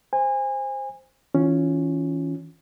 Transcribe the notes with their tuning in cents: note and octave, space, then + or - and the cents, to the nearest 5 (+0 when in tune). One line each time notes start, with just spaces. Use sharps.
C5 +0 G#5 -30
E3 -35 C#4 +0 F4 +0